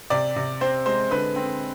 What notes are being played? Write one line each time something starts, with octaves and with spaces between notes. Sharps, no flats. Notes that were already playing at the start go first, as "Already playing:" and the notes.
C3 D5
C3
C4 C5
G#3 C5
D3 B4
C4